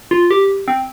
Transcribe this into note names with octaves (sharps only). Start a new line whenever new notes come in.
F4
G4
C4